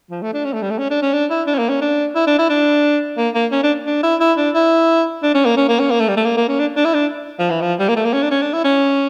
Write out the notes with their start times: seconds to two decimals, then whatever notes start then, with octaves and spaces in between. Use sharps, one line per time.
0.11 F3
0.22 A3
0.33 D4
0.44 C#4
0.53 A3
0.62 G3
0.71 A3
0.79 C#4
0.90 D4
1.02 C#4
1.13 D4
1.30 E4
1.47 D4
1.54 C#4
1.59 A#3
1.69 C#4
1.81 D4
2.15 E4
2.27 D4
2.39 E4
2.50 D4
3.17 A#3
3.35 A#3
3.52 C#4
3.64 D4
3.87 D4
4.03 E4
4.20 E4
4.38 D4
4.55 E4
5.23 D4
5.34 C#4
5.46 A#3
5.57 C#4
5.69 A#3
5.80 C#4
5.91 A#3
6.00 A3
6.08 G3
6.17 A3
6.25 A#3
6.37 A#3
6.48 C#4
6.59 D4
6.77 D4
6.85 E4
6.94 D4
7.39 F3
7.50 E3
7.61 F3
7.79 G3
7.89 A#3
7.96 A3
8.05 A#3
8.13 C#4
8.22 D4
8.31 C#4
8.42 D4
8.53 E4
8.64 C#4